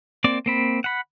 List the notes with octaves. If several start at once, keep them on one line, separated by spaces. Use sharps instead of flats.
A#3 C4 D5 D6
A#3 C4 B5
F#5 B5